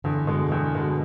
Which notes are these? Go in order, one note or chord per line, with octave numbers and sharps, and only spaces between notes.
E2 D3
B2 G#3
E2
B2 G#3